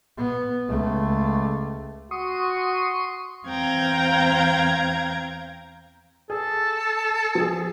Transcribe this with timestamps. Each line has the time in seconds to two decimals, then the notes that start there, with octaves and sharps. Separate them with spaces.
0.18 B3
0.69 C#2 A3
2.11 F#4 C6 C#6 D#6
3.48 E2 C4 F5 G5 A#5 G#6
6.30 G#4 A4
7.35 F3 G#4